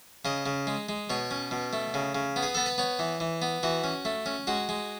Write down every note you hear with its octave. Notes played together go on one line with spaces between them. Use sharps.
C#3 D#5
C#3
G#3
G#3
B2 C#5
C#4
B2
A3
C#3
C#3
B3
G#4
B3 A4
B4
B3 C#5
E3
E3
B3
E3 F#4
C#4
A3
C#4
G#3 F#4
G#3